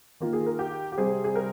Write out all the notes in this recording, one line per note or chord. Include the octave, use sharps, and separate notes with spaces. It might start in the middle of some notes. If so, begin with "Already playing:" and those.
D#3 A#3 F4
G#4
A#4
G4
G4
C3 G3 C4 G#4
G#4
A#4